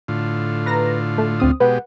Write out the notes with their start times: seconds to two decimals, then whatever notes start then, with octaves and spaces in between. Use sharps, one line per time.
0.08 A2 D3 F4
0.66 B4 A#5 A#6
1.18 A3
1.40 D2 C4 D#6
1.60 B2 G#3 G4 B4 F#5